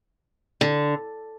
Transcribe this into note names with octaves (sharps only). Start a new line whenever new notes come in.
D3